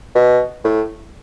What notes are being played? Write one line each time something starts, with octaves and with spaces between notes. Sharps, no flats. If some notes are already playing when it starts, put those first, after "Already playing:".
B2
A2